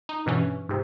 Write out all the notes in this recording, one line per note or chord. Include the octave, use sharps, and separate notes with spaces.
D#4
G2 B2 E3 C#4
G#2 C3